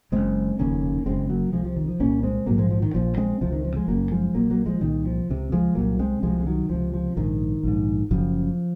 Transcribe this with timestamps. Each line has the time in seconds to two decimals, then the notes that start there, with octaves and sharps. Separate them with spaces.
0.12 F#1 F#2 C#3 G#3 C4
0.59 F1 D#2 C#3 A#3 C#4
1.06 F#1 F#2 C#3 G#3 C4
1.29 F#3 A#3
1.53 C2 C3 F3 G#3
1.64 F3
1.77 D#3
1.88 F3
2.00 C2 A#2 A#3 C#4
2.23 G#3 C4
2.46 A#1 G#2 F#3 A#3
2.58 F3 G#3
2.70 F3
2.82 D#3
2.94 A#1 A#2 F3
3.17 G#3 C4
3.41 C#2 C3 F3
3.52 D#3
3.65 F3
3.76 F3 G#3
3.88 F#1 F#2 C#3 F#3 A#3
4.11 F3 G#3
4.35 A#1 A#2 F#3 A#3
4.50 F#3 A#3
4.66 F3 G#3
4.81 C2 A#2 D#3
5.05 F3
5.29 C#2 C3
5.52 F3 G#3
5.75 C2 A#2 F#3 A#3
5.99 G#3 C4
6.22 C2 C3 F3 G#3
6.40 G#3
6.46 D#3 F#3
6.69 C#2 C3 F3
6.94 F3
7.16 A#1 G#2 D#3
7.63 A#1 G#2
8.11 F#1 F#2 C#3 F3